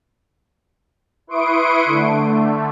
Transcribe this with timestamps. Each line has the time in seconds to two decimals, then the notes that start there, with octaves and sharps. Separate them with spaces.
1.27 E4 B4 C6 C#6 D#6 D7
1.85 D3 A3